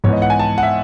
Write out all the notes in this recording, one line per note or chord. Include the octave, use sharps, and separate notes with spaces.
G#2 E3 B3 C#5
D#5
F#5
G#5
A5
F#5
E5